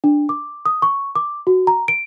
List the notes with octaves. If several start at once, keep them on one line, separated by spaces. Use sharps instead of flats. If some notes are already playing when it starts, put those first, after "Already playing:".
D4
D6
D#6
C#6
D6
F#4
A#5
D7